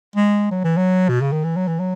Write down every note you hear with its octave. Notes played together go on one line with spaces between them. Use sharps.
G#3
F#3
E3
F#3
B2
C#3
D#3
E3
F#3
E3
F#3